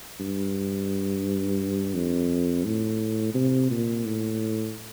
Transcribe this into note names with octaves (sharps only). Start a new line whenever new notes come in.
G2
F2
A2
C3
A#2
A2